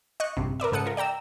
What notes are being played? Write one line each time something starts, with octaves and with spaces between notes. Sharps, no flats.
D#5 C#6 F#6
A#1 G2 C3
A#4 B4 D5 E5
G#2 C#3 A4 F#5 D#6 C#7
F4 A#4
D5 G5 A#5 E6